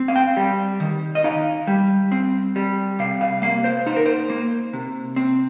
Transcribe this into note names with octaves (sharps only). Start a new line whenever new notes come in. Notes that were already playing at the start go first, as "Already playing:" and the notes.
Already playing: C4
F5
G5
G3
D#3
D#5
D#4 F5
G3
C4
G3
C3 F5
F5
A#3 F5
C5
D#4 C5
A#4
C5
A#3
C3
C4